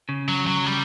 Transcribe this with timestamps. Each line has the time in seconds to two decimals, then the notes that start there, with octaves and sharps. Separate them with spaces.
0.09 C#3
0.28 F#3
0.47 F#3
0.66 G3